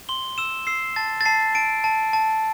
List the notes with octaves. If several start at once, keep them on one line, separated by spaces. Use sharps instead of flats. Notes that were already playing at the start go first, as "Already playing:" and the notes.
C6 G7
E6 E7
E6 C7
A5 A6
A6
A5 C7
A5 D7
A5
A5